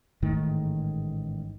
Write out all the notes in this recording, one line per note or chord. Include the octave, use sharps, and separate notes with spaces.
A1 G#2 D#3 A3